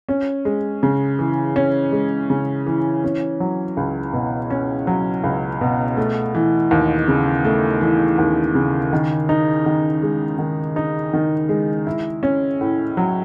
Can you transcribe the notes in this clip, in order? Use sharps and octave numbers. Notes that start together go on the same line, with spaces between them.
C#4
G#3
C#3
E3
C#4
G#3
C#3
E3
C#4
F#3
C#2
B2
C#4
F#3
C#2
B2
A3
E3
D#2
C#3
A3
E3
D#2
C#3
D#3
D#4
D#3
G#3
D#3
D#4
D#3
G#3
E4
C#4
A2
F#3